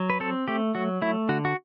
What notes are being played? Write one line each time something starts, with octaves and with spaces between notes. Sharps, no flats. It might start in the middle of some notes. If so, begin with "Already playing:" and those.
Already playing: F#3
B4
C4 A4
A3 G4
F#3 F#4
A3 E4
D3 F#4
F#4